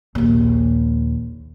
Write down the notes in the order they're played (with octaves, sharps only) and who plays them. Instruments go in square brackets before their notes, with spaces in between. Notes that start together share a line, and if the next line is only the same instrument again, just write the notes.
[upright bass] A#1 D#2